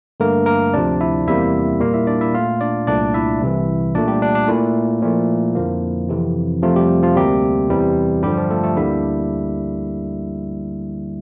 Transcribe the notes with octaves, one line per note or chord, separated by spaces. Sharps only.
G2 D3 A3 A#3 A#4
A#3 A#4
D2 C3 F3 D4 D5
E4 E5
E2 C3 G3 A#3 E4 E5
A#2 G3 A#3 F4 F5
E4 E5
D4 D5
E4 E5
A#2 A3 F4 F5
D4 D5
C2 A#2 A3 D4 D5
E4 E5
C2 C3 E3
A#2 A3 D4 D5
G3 G4
D4
D4
A#2 A3 E4
A#2 F3 A3
F2 D3 F3 A#3
F2 C3 E3
F2 C3 F3 A3 F4
G3 G4
F3 F4
D2 C3 G3 A#3 G4
E2 C3 E3 G3
G2 D3 F3 G3 G4
F3 F4
A3 A4
A3 A4
D2 D3 G3 A#3 E4 E5